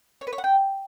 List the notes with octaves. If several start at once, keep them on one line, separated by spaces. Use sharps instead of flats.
C#5
B4
C#5
F#5
G5